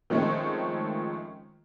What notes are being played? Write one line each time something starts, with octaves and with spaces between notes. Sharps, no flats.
D#3 F3 G#3 A3 C4 C#4